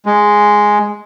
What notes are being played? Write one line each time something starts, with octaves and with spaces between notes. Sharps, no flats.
G#3